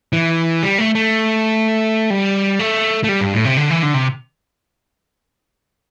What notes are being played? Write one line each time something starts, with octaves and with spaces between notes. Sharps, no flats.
E3
G3
A3
A3
G3
A3
A3
G3
G2
A2
C3
D3
E3
D3
C3